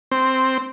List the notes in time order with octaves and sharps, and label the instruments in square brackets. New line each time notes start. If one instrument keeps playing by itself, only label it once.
[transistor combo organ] C4